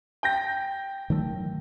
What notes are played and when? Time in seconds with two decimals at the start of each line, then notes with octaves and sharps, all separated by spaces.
0.23 G5 G6 A#6
1.10 D#3 F#3 A3